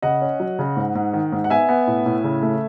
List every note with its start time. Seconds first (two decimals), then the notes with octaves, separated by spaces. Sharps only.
0.02 C#3 D#5 F#5
0.21 C#4
0.40 F#3
0.59 C#3
0.77 G#2
0.95 G#2
1.13 D#3
1.32 G#2
1.44 F#5
1.50 B3 E5 G#5
1.69 B3
1.87 A2
2.06 A2
2.24 C#3
2.42 A3